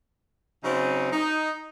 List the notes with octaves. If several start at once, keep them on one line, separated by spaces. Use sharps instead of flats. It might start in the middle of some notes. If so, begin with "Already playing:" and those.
C#3 F#3 C4 D#4
D#4